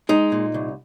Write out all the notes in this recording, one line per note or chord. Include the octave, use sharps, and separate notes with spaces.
G#3 D#4
A#2
C2